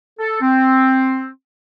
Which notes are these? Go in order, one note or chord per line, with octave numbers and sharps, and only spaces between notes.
A4
C4